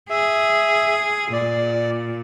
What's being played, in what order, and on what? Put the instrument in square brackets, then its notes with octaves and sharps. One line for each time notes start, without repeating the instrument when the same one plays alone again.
[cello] G#4 [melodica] E5
[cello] A#2 [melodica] D5